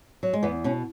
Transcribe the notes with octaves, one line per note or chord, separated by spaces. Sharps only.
F#3
G#3
E2 B3
B2 C#4